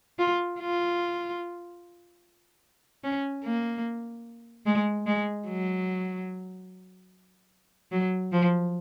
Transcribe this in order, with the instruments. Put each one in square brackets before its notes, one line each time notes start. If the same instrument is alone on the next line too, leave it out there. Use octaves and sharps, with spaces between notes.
[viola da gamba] F4
F4
C#4
A#3
G#3
G#3
F#3
F#3
F3